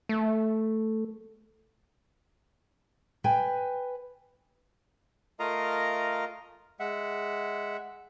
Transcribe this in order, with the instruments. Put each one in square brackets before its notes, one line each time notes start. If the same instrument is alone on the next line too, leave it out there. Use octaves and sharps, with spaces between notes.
[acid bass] A3
[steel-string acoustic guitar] B4 G5 G#5
[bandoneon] A3 F4 A#4 D#5 F5 A#5
G#3 E5 F#5